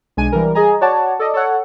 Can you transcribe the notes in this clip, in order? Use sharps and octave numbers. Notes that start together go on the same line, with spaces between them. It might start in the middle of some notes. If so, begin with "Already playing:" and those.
B1 G#3 D4 G#5 D#7
E3 G3 A#4
G#4 D#5 G#5 A#5
F#4 C#5 D5 F#5 A5
A4 D5 D#5
A4 C#5 F#5